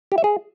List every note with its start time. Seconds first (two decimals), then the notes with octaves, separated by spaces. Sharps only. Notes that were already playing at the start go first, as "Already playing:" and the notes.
0.12 G4
0.18 E5
0.24 G#4